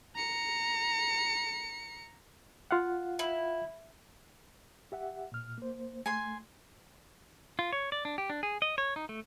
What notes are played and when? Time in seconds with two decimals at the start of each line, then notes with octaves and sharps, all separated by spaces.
0.15 A#5 C#7
2.71 F4 F5 F#5
3.19 E4
4.92 G4 E5 F#5
5.32 A#2 F6
5.58 A#3 C5
6.06 A3 G#5 C6
7.59 F4
7.73 C#5
7.92 D5
8.05 D4
8.18 G4
8.30 D4
8.43 G#4
8.62 D#5
8.78 C#5
8.96 D#4
9.09 A3